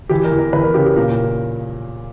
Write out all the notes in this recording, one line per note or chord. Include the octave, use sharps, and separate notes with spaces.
E3 G4
A#4
E2
A#4
E2 B4
A#4
C#3 G4
G4
A#2 A#4